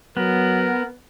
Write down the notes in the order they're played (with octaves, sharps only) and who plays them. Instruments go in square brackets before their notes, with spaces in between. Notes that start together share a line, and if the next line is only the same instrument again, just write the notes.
[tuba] F#3 [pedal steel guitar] B3 [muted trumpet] A#4